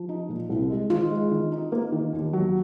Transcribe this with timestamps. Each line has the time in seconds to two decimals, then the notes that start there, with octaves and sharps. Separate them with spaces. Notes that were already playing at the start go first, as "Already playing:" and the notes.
Already playing: F3
0.09 D#4
0.29 A#2
0.49 C2
0.70 G#3
0.90 D#3 F4
1.11 G#3
1.31 D#3
1.52 D#4
1.72 A#3
1.92 D#3
2.13 D#2
2.33 F#3